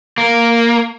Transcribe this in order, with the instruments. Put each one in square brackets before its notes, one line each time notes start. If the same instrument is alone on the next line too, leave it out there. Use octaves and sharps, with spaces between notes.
[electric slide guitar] A#3